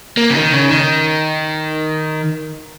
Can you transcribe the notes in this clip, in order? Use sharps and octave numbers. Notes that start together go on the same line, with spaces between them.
A#3
C#3
D#3
C#3
D#3